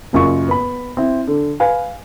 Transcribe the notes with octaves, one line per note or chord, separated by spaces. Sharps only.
F#1 F#2 F4 C#6
B3 B5
C4 E4
D3
B4 F5 G#5